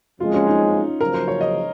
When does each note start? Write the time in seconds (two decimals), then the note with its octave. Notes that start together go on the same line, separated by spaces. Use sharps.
0.20 F#1 F2 C#3 F3 G#3 F4
0.34 C#4
0.47 D#4
1.00 F#1 F#2 C#3 F3 A#4
1.14 C5
1.28 C#5
1.41 D#5